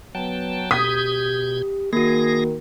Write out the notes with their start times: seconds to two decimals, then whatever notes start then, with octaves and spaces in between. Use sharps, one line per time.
0.15 F#3 B3 G5 A5
0.71 B2 G4 D#6 G6 G#6 B6
1.93 D#3 A#3 F#4 G#4 A#6